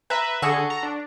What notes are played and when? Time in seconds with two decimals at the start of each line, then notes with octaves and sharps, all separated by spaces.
0.10 B4 E5 A#5
0.42 D3 F#4 G#4 A4 C#6
0.70 A#5
0.83 D4